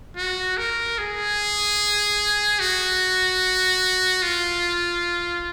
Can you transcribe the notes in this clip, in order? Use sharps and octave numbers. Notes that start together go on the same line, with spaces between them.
F#4
A#4
G#4
F#4
F4